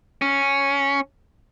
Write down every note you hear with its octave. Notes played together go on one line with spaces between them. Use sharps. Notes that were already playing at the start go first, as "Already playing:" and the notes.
C#4